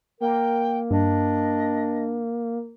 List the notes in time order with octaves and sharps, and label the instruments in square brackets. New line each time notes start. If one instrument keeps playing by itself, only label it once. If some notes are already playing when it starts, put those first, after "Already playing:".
[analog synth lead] A#3 [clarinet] A#4 [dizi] G5
[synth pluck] G2 [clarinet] D4 [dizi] D#5